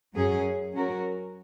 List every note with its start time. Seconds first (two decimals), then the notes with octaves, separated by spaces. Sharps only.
0.15 F#2 F#3 C#4 G#4
0.73 F#3 C#4 F#4 A#4